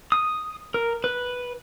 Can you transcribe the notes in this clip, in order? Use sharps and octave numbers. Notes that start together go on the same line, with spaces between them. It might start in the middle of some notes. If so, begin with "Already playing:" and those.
D#6
A#4
B4